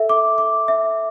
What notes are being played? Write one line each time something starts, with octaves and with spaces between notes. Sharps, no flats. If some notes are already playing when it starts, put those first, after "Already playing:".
Already playing: A4 E5
D6
D6
E5